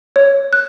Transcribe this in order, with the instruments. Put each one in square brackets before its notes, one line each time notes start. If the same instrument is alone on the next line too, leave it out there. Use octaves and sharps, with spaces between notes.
[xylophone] C#5
F#6